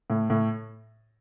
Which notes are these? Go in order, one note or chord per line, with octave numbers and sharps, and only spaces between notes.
A2
A2